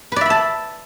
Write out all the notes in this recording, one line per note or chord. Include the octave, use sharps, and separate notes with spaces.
B4 D5 E5 A5 B5